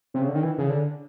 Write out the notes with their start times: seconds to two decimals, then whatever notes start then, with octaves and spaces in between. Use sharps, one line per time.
0.14 C3
0.21 C#3
0.29 D3
0.35 D#3
0.43 E3
0.58 C#3
0.70 D3